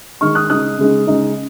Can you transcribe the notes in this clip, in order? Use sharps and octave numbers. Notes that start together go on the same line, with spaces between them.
D#3 G#3 D#4 C#6 F6
D#6 F#6
C#3 G#3 D#4 D#6 F#6
C#3 G#3 D#4
C#3 G#3 D#4